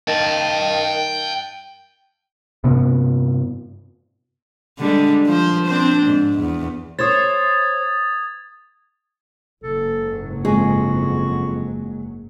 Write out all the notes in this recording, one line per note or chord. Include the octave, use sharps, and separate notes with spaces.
D#3 G5 A5
G2 C3 B3
D3 G3 G#3
F3 C5
C4 D4 C5
G#2
E2
C5 C#5 D#6 G#6 A6
F#1 G#2 F#3 A4
F2 G#3 F#4